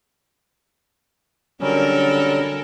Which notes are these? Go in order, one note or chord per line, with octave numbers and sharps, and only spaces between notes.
D3 F#3 G3 C#4 A4 A#4